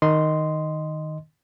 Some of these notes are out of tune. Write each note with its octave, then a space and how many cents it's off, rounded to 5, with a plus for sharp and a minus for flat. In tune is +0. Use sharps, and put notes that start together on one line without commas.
D#3 +0 D#5 +0 C6 -10